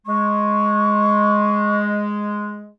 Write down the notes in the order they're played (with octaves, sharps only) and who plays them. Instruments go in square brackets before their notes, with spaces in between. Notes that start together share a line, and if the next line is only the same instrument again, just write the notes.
[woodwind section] G#3 [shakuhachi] C#6